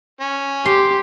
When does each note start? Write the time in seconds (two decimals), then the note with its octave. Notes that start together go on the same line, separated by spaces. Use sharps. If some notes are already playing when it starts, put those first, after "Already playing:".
0.21 C#4
0.65 G4 C6